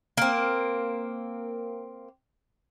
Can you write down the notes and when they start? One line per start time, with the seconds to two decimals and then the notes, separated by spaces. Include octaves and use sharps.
0.17 A#3 C4